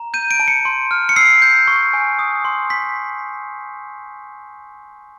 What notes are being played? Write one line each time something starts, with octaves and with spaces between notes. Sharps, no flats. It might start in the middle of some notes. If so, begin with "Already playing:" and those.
Already playing: A#5
G6 D#7
D7
A5
C#7
C6
F6
C#7
E6 C7
G6
C#6
G#5
D#6
C6
C6 B6